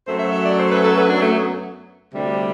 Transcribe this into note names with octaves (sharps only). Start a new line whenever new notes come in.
F#2 F#3 A3 C5
E5
E5
D5
C5
B4
A4
B4
D4
A3
B3
D2 C3 G3